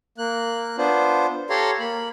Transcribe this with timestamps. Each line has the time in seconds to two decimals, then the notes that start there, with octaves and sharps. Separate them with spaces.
0.18 A#3 F#6
0.78 B3 D4 F4 C5
1.50 G4 A4 C#5 F5 A#5 C6
1.80 A#3 B5